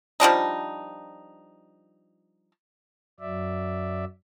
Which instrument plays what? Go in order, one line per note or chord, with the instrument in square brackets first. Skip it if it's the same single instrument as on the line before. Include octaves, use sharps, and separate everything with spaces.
[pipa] F3 G3 D4 D#4
[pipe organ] F#2 F#3 D5 E5